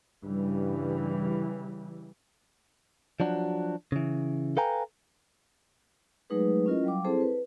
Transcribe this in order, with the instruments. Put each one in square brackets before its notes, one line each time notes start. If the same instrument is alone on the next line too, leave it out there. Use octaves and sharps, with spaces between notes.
[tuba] G2 [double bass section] C#3 E3 G3
[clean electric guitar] F3 F#3 D4 F#4
C#3 E3
A4 B4 F5 G5 G#5 A#5
[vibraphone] F#3 G#3 A3 D#4 G#4 B4
C#4 E4 F4 A#4 D#5
F#3 G3 F5 G5 D6
C4 E4 G#4 A4 C5 A5
B4